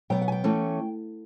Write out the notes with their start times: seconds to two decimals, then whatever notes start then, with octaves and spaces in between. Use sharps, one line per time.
0.10 B2 F#3 B3 G5
0.21 F#5
0.28 G#5
0.32 G5
0.44 E3 A3 C#4